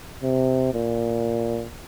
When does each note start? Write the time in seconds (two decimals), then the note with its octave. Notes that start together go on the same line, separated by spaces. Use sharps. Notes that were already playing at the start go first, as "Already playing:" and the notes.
0.23 C3
0.74 A#2